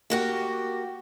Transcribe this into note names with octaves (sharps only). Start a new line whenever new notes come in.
A#3 F#4 G4